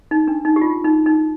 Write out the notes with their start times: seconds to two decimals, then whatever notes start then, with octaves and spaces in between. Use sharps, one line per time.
0.11 D#4
0.28 D4
0.45 D#4
0.56 G4
0.61 F4
0.84 D#4
1.06 D#4